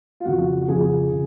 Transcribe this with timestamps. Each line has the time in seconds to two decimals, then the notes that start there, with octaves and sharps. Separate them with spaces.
0.20 F4
0.25 F2 C#3 F3 F#4
0.61 F#4
0.68 F2 C#3 F3 G#4
1.11 C#3